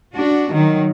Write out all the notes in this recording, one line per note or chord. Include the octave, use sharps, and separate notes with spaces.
D4 F#4
D#3 F#3